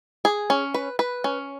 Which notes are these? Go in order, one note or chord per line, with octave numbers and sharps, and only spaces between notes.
G#4
C#4
B4
B4
C#4